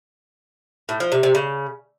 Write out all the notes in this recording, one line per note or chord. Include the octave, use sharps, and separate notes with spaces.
A2
F3
C3
C3
C#3